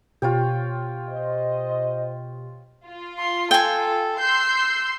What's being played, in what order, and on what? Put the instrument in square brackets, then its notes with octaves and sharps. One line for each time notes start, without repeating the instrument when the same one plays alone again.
[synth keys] B2 G4 [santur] F4 C#5 G5
[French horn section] C5 D#5
[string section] F4
[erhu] C6
[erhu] A4 [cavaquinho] G5 G#5
[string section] C6 E6 C7 [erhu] G6